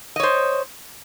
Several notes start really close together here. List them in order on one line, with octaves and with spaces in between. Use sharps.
D#5 C#5 C5